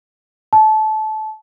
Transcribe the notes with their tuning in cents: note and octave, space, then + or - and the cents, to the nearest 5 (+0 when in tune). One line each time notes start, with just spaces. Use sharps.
A5 -20